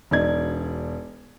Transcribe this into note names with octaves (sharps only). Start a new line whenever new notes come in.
E1 D#4 D5 G#6